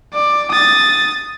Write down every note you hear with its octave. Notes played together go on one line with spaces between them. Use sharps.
D5
D#6 A6